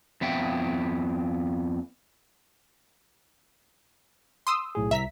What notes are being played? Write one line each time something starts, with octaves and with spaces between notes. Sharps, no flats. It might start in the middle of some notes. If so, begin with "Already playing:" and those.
F2 B3 E5 G5
C6 D#6 E6
B1 A2 G#4
C2 E5 A#5 B6